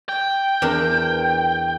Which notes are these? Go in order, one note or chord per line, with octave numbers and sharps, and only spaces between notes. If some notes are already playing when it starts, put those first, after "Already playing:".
G5
E2 D4 A#4